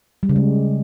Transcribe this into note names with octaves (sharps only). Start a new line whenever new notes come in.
G3
C#3
G#3